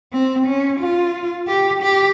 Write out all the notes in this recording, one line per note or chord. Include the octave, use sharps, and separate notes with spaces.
C4
C#4
F4
G4
G4